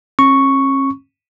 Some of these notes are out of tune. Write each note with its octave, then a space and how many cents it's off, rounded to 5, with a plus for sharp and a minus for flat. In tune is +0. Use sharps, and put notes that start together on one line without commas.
C#4 -45 C#6 +0